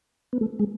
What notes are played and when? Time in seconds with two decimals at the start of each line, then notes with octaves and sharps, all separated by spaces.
0.33 B3
0.41 A3
0.59 G#3